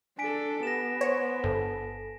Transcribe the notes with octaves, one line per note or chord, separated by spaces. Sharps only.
D4 A4 G#5 B6 D7
B3 G4 A#6 E7
C5 C#5
G1 A4